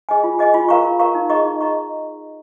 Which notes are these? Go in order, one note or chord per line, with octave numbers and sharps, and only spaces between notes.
G#4 D#5 G#5
F4
G#4 D#5 G#5
F4
A#4 F5 A#5 C#6
F4
A#4 F5 A#5 C#6
D#4
G#4 D#5 A#5 C#6
D#4
G#4 D#5 A#5 C#6